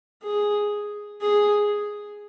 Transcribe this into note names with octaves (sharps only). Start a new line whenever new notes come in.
G#4
G#4